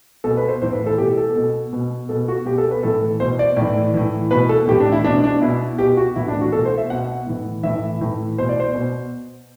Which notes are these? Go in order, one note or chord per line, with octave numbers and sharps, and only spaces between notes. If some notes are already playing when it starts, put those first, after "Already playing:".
B2 A4
B4
C5
A2 E3 C5
B4
A4
B2 G4
A4
B2
B2
B2 A4
F#4
B2 G4
A4
B4
A2 E3 A4
B2 C5
D5
A2 E3 D5
A2 E3
B2 B4
A4
A2 E3 G4
D4
E4
B2 D4
D4
B2 E4
B2 G4
F#4
A2 E3 E4
D4
F#4
B2 A4
C5
E5
B2 F#5
A2 E3
A2 E3 E5
A2 E3
B2 C5
D5
C5
B2